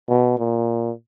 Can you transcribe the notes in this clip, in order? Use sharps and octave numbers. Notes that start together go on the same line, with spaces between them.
B2
A#2